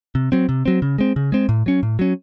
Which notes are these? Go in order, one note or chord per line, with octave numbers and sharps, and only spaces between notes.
C3
F#3 C4
C3
F#3 C4
C#3
G#3 C4
C#3
G#3 C4
A2
F#3 C#4
A2
F#3 C#4